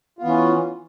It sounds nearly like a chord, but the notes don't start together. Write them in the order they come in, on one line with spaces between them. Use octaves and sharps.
F4 B3 E3 C#4